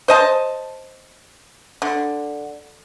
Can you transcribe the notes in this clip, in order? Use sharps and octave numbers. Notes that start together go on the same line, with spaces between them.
C5 D#5 A5
D3